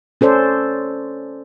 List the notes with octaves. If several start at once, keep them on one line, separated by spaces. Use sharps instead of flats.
C#4 A4 C5 D5